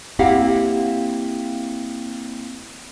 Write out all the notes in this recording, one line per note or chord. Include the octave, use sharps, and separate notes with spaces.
A#3 C4 E4 G4 F5 F#5